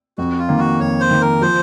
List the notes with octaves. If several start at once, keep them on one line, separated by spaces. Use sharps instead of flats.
F2 F#4
F4
D#3 A#3
F#4
F2 C#5
C5
D#3 A#3
A#4
F3 C5